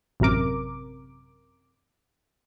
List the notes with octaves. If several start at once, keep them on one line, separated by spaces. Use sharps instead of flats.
A1 F#2 C3 A#4 D6